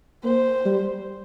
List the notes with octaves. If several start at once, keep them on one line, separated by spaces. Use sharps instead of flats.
A#3 C5
G3